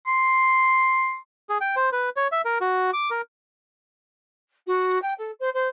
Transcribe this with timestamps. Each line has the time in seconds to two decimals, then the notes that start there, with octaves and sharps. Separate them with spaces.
0.07 C6
1.49 G#4
1.61 G5
1.76 C5
1.92 B4
2.17 C#5
2.32 E5
2.45 A#4
2.61 F#4
2.93 D6
3.10 A#4
4.66 F#4
5.02 G5
5.18 A4
5.39 C5
5.54 C5